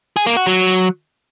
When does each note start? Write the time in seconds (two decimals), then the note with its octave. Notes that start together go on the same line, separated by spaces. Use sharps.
0.17 G#4
0.27 A#3
0.37 F#4
0.47 F#3